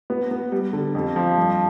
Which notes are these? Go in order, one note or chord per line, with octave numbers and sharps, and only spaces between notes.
B3
B3
G3
D3
F2
F3
G2